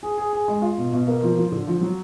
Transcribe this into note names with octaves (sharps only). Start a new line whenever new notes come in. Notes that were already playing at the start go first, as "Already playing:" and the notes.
G#4
G#4
G#4
G#3
F4
B2
B2
A#3
F3
F3
D3
F3
F#3